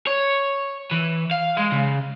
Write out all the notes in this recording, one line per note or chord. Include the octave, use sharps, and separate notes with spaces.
C#5
E3
F5
G#3
C#3